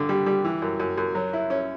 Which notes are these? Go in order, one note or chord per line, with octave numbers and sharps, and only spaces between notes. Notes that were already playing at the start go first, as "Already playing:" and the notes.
Already playing: G2 D3
G3
G3
E3
F#2
F#2
F#2
F#3
E4
C#4